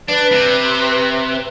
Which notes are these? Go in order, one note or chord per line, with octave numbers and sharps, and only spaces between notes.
D4 B4
C3